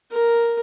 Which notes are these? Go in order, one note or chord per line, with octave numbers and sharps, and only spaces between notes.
A#4